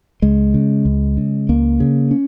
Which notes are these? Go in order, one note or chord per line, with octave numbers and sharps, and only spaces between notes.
C#2 G#3
C#3
C#2
C#3
C#2 A#3
C#3
C#4